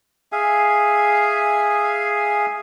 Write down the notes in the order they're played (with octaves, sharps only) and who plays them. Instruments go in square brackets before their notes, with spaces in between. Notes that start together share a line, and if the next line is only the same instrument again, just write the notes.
[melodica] G#4 E5 F5 G#5